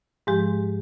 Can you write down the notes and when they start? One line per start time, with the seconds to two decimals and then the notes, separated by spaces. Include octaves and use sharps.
0.27 G#2 F3 G#3 G4